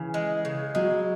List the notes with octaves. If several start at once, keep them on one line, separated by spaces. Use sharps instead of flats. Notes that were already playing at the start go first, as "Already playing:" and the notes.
Already playing: C#3 E3
G#3
C#3
F#3 G#3